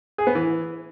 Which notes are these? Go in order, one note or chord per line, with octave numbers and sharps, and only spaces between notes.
G#4
B3
E3